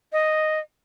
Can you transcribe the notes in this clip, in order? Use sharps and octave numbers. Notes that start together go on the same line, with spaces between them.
D#5